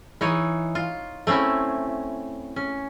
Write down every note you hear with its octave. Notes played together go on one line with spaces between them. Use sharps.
E3 D#4 C#5
F4
A3 C4 C#4 E4
C#4